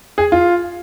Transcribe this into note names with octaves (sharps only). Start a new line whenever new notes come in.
G#4
F4